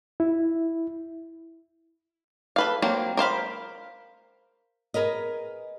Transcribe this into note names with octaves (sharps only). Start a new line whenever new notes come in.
E4
A4 B4 F5
F#3 A#3 C4
A#4 C5 F5 B5
G#4 A#4 B4 D#5